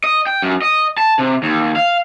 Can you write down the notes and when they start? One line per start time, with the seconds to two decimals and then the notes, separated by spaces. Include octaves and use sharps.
0.04 D#5
0.27 G5
0.42 F#2
0.62 D#5
0.98 A5
1.19 C3
1.43 D#2
1.76 F5